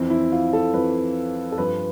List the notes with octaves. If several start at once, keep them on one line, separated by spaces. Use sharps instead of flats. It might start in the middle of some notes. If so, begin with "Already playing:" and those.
Already playing: F2 E3 C4
E4
F4
A4
F2 E3 B4
A4
G2 F3 B4